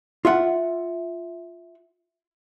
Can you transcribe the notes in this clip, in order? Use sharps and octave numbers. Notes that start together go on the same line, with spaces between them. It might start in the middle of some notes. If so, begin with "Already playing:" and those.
F4 E5 F#5